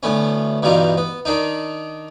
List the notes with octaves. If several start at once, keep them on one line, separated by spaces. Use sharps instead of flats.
D2 A2 B3 C#4
G2 B2 E3 G3 D#4 F4
B3
D#3 D4 D#4